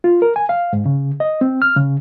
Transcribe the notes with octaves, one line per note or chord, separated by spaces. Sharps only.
F4
A#4
G#5
F5
G#2
C#3
D#5
C4
F6
C#3